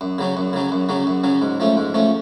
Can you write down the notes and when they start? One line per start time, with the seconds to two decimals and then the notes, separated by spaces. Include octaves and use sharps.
0.01 F#2
0.18 C#3 F#3 C#4
0.37 F#2
0.53 C#3 F#3 C#4
0.72 F#2
0.89 C#3 F#3 C#4
1.07 F#2
1.24 C#3 F#3 C#4
1.42 G#2
1.60 F3 A3 C#4
1.77 G#2
1.94 F3 A3 C#4